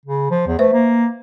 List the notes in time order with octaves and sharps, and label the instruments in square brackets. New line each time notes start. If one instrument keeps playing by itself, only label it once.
[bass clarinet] C#3
F3
E2
[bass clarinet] A3 [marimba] B4 C5 E5
[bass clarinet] A#3